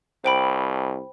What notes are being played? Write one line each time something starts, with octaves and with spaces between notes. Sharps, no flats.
C2 C5 G5 B5